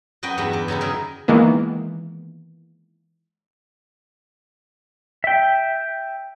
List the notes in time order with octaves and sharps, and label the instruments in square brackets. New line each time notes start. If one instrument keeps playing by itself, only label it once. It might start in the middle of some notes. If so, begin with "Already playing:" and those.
[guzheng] F#2 F#4 B4 D#5 G5
E2 G2 B4 F#5 B5
G4
F#2 C#3 D#4 E4
D#3 E4 G#4 A#4
[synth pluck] D#3 E3 G#3 A#3 B3
[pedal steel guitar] E5 G5